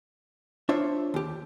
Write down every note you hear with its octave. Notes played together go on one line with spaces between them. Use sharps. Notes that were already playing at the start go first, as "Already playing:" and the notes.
D4 F4 C5 C#5 E5
D#2 G4